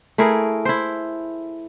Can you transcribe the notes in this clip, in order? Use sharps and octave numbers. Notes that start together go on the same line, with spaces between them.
A3 E4 G#4 A#4
E4 C5